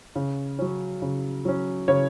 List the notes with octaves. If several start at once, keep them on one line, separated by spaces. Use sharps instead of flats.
C#3
F#3 C#4
C#3
F#3 C#4
C#3 C#5